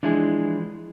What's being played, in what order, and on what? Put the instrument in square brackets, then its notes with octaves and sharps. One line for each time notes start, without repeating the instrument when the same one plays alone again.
[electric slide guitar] E3 F3 G#3 [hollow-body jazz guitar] D4 E4 G#4